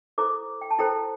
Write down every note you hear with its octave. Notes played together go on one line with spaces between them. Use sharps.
E4 A4 C5 A#5 D6
G5
A5
E4 A4 C5 G5 A#5